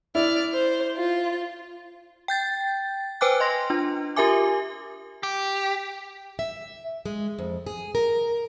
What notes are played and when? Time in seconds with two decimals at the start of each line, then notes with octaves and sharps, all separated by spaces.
0.15 E4 D5 F6
0.53 C5
0.97 F4
2.28 G5 G6 A6
3.21 B4 C5 G5 G#5 D6 F#6
3.40 D#5 C6 A#6
3.70 D4 F4
4.16 F4 G4 A#4 E5 G#5 D6
5.23 G4
6.39 E5
7.06 G#3
7.38 F2
7.66 G#4
7.95 A#4